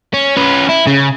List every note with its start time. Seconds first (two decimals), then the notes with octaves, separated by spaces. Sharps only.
0.14 C#4
0.37 C#4 B4
0.69 E4
0.87 C#3